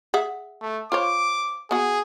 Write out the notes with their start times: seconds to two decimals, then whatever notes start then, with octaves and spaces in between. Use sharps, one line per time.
0.14 G#4 E5 F#5
0.62 A3
0.92 F4 C5 C#5 D6
1.71 B3 F#4 G#4